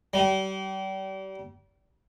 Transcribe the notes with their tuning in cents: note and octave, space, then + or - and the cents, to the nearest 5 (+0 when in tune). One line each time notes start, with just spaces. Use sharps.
G3 -35